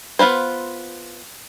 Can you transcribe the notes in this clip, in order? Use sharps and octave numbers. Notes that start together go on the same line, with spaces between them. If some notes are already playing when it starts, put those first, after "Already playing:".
B3 F4 B4 C5